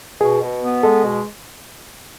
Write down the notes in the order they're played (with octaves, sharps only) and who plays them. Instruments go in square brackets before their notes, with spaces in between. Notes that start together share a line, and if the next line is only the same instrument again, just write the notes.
[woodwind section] B2 [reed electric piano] G#4
[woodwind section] B2
B3
[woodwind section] G#3 [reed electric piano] A4
[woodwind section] B2